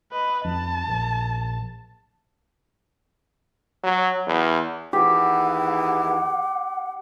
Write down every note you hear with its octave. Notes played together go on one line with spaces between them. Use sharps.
B4 D#5
F2 A5
A#1
F#3
E2
D#2 E3 G4 G#4 F#5